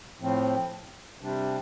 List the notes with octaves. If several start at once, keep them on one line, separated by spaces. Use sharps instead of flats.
A2 F3 C4
C3 G3 D4